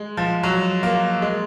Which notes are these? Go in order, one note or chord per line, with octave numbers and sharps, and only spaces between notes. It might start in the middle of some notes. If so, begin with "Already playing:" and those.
Already playing: G#3
F3
F#3
A#3
G#3